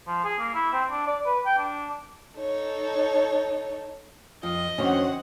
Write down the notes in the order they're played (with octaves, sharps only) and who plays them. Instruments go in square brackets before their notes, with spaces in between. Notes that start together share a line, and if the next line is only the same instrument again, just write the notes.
[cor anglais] F3
G#4
A#3
E4
C4
D4
D5
B4
G5
D4
[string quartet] D#4 A4 C#5
[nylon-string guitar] F2 [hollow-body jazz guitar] F3 [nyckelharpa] D#5
[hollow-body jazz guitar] F2 D3 D#3 [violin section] C4 C#5 F#5 [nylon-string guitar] C#4 F#4